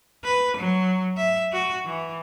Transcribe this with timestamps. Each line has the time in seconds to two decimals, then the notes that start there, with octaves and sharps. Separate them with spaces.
0.24 B4
0.57 F#3
1.17 E5
1.53 F#4
1.85 E3